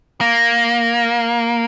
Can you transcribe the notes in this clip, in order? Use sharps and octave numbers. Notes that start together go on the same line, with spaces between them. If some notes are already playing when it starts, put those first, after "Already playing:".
A#3